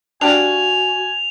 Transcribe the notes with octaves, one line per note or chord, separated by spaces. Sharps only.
D4 F#4 G4 F5 G#5 F7